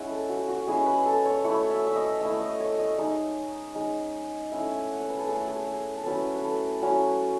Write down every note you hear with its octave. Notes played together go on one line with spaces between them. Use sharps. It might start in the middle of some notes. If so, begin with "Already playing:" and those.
Already playing: G#3 C#4 E4 F#5
A4
F#4
F#4
G#3 C#4 E4 G#4
B4
A4
C#5
A3 E4 C#5
E5
E5
D#5
A3 E4 E5
D#5
C#5
D#5
G#3 D#4
G#3 D#4
A3 C#4 E4 E5
G#5
F#5
C#5
B4
A4
A3 C#4 E4 G#4
G#4
G#4
A4
F#3 C#4 E4 B4
B4
A4
F#3 C#4 E4